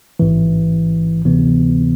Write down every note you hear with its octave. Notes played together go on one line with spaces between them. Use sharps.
A1 G#2 E3
D2 C3 E3 B3